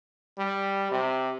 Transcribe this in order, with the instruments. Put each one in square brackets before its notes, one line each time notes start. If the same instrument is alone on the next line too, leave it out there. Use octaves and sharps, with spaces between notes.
[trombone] G3
C3